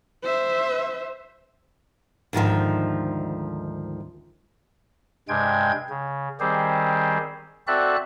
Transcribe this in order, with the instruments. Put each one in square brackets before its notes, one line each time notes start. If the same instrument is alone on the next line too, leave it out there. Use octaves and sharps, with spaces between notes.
[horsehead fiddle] C5 E5
[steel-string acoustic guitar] D2 G#2 D#3 F3
[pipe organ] G2 C3 G#3 G5 G#6
C#3
D#3 G3 C4 G4 G#4 C5
C4 F#4 A4 D5 E5 F#6